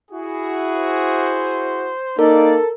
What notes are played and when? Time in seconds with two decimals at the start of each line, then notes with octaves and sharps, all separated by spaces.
0.11 E4 F#4 G#4
0.75 C5
2.19 A#3 D#4 A4 A#4 D5